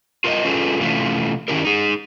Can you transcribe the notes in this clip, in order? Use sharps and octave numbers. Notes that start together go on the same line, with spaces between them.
F4 A#4 C5 D5 D#5
C#4 F4 G#4 A4 B4
C3 E3 A3 C#4 F4
D#3 F3 C#4 E4 G4 A#4
D#4 G#4